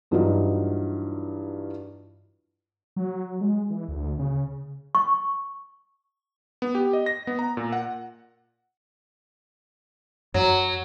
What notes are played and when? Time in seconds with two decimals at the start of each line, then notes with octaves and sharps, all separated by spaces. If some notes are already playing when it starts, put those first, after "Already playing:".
0.11 G2 E3 F#3 D#4 F4 F#4
2.96 F#3
3.41 G#3
3.70 E3
3.88 D2
4.19 C#3
4.95 C#6
6.62 B3
6.75 G4
6.93 D#5
7.06 A#6
7.27 B3
7.39 A#5
7.57 A#2
7.72 F#5
10.34 F#2 F#3